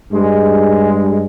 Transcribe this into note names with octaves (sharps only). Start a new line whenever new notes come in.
G2 G#3